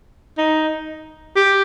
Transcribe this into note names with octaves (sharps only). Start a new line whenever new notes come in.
D#4
G4